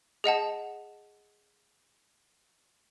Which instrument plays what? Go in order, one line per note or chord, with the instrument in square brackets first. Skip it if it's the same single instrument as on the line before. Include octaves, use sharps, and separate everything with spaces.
[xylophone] G#4 D#5 F#5 A5